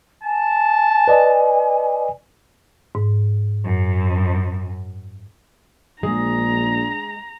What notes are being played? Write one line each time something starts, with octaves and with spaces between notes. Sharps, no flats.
G#5 A5
B4 D5 D#5
G#2
F#2
A#1 G#3 D4 A#5